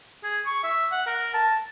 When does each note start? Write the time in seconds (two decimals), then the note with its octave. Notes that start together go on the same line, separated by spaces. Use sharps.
0.24 G#4
0.46 C#6
0.64 E5
0.92 F#5
1.06 A#4
1.34 A5